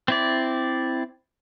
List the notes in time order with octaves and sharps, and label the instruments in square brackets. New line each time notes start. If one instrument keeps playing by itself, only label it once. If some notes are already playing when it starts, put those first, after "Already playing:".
[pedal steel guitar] C4 E4 D5